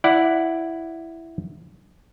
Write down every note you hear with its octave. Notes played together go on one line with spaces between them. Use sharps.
E4 D5 F#5